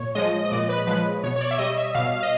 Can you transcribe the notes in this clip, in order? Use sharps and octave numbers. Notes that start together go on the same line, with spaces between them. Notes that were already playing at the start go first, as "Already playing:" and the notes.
Already playing: A#2 C#5
F3 G#3 D#5
D#5
A#2 D5
B4
F3 G#3 B4
B2 C#5
C#5
D5
E5
G3 D#5
E5
B2 F5
F5
D#5